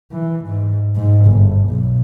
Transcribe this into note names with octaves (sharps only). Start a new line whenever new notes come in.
E3
G#2
G#2
G1
B1